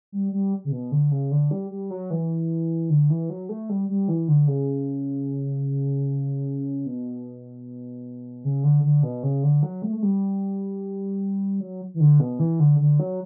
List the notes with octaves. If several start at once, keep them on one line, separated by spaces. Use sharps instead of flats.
G3
G3
C#3
B2
D3
C#3
D3
G3
G3
F#3
E3
D3
E3
F#3
A3
G3
G3
E3
D3
C#3
B2
C#3
D3
D3
B2
C#3
D3
F#3
A3
A3
G3
F#3
E3
D3
B2
E3
D3
D3
F#3